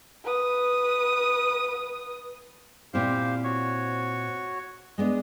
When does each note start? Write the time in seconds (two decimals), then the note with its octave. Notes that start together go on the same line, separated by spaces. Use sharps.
0.24 B4 D#6
2.94 A#2 C4 E4 G4 C5 F5
3.44 F#4 C#5 C#6
4.98 G#3 B3 D4 D#5